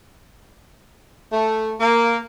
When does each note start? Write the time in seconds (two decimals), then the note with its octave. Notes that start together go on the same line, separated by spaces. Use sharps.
1.33 A3
1.80 A#3